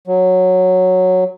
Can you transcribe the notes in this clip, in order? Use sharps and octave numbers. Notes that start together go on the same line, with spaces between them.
F#3